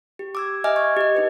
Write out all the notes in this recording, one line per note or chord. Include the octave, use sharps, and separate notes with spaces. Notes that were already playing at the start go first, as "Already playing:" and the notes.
G4
D6 E6 G#6
D#5 E5 G#5 D6 F6
C#6 G#6
G4 D#5
D#4 G4 B4